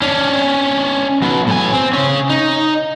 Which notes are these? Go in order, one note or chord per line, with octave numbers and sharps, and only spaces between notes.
C#4 D4
F#3 B3
A2 G#5
C4
C#3 C#4
D#4